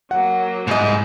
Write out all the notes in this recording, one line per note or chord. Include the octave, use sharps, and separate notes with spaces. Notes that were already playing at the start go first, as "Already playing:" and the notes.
F#3 A#3 F#5
C2 G#2 E4 D#5